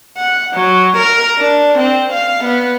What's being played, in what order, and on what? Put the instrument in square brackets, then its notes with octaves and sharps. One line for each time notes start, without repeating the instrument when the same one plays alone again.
[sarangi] F#5
F#3
A#4
D4
C4
F5
B3